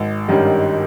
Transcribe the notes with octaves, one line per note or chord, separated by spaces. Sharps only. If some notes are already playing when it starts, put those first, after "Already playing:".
Already playing: G#1
G2 D#3 G3 C#4